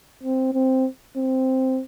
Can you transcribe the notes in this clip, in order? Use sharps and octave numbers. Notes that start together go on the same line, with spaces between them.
C4
C4
C4